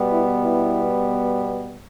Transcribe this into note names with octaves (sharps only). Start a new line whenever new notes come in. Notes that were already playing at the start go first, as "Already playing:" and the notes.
Already playing: B2 G3 B3
E4
E4